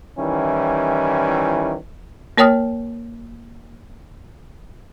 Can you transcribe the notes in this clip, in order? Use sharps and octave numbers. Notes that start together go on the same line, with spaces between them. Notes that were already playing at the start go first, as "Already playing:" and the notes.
D#3 E3 G3 C#4 E4
A#3 A#4 C#5 G5 D#6 F6